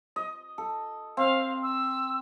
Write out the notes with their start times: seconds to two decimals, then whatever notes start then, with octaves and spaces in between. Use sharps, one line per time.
0.16 D#5
0.58 A4
1.17 C4 F5
1.63 E6